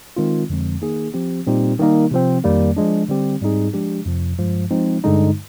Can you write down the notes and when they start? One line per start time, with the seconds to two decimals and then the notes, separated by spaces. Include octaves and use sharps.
0.17 D#3 G#3 C4 F4
0.50 F2 D3 F3 G#3 C4
0.81 D#3 A#3 D#4 G#4
1.14 F3 C4 G4
1.47 A#2 G3 C4 D#4 G4
1.79 D#3 G3 A#3 D#4
2.11 C3 F3 C4
2.44 F2 D#3 G3 A#3
2.77 F3 G#3 D4
3.08 D3 G3 C4 G4
3.41 G#2 G3 C4 D#4 G#4
3.73 F3 G#3 D4 G4
4.06 F2 C3 F3
4.39 G2 F3 G#3
4.71 F3 G#3 C4 D#4
5.04 G2 D3 G#3 D#4